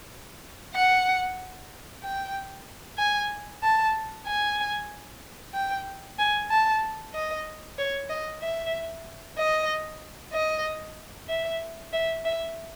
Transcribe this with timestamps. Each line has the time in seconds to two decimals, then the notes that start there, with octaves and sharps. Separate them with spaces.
0.75 F#5
2.03 G5
2.98 G#5
3.63 A5
4.27 G#5
5.54 G5
6.19 G#5
6.50 A5
7.14 D#5
7.78 C#5
8.09 D#5
8.42 E5
9.38 D#5
10.33 D#5
11.29 E5
11.93 E5
12.25 E5